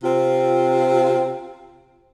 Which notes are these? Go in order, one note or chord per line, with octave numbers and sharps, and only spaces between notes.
C3 C4 F4